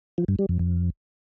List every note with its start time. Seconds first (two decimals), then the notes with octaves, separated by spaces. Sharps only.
0.18 F3
0.28 G2
0.39 G3
0.49 F2
0.59 F2